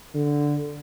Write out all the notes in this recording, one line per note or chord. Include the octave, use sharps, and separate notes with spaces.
D3